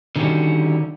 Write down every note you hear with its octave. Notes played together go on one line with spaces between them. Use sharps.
D3 D#3 G3 B3 C#4 F#4